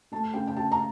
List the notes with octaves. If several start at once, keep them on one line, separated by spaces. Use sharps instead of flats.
A3 A5
C#3 G5
G5
C#3 A5
A#5